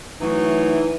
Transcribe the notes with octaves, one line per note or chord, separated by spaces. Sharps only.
E3 F#3 A3 D#4